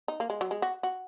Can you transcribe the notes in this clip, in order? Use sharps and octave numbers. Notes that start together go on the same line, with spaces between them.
D#4
A#3
G#3
F#3
G#3
F#4
F#4